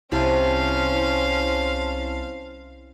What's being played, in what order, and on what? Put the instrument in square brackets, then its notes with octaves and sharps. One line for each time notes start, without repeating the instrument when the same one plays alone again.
[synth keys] C2 E4 A5 [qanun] C3 [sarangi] C#4 [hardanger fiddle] C5 F5